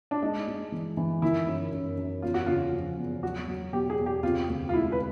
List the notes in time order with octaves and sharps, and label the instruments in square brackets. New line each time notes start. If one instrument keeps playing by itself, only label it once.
[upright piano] D4
[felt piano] G#3 [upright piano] D#4
[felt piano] G#3
E3
E3
[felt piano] D#3 [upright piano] E4
[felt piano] F#2
F#2
F#2
[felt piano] E2 [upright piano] F4
[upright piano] F#4
[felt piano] C#3 [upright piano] F4
[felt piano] F3
E2
[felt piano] F#3 [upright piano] F#4
[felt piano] F#3
[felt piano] B2 [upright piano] G4
[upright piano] G#4
[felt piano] E2
[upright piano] G4
[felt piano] C3 [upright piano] F4
[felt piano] D2
[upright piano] F4
[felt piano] G#3 [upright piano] E4
[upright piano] B4